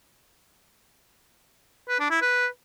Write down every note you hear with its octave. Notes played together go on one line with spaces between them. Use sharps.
B4
D4
E4
B4